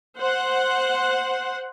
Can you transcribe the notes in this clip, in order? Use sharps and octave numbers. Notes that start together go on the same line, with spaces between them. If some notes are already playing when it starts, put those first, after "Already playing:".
C5 F#5